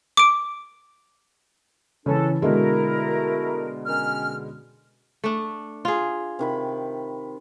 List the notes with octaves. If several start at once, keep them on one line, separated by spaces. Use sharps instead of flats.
D6 D7
C#3 E3 C#4 D4 A4
B2 D3 G#3 A3 E4 A#4
D#3 C#4 F6
A3 D4
F4 G#4
C3 D#3 B5